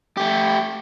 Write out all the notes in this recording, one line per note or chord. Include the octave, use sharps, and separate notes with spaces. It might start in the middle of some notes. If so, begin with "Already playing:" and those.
A3 G4